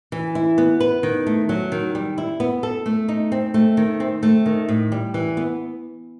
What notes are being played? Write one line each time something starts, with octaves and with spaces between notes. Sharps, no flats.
E3
E4
B3
B4
D#3
A3
F#3
D#3
G3
E4
B3
A4
A3
D#4
C4
A3
D#3
C4
A3
D#3
A2
G3
E3
B3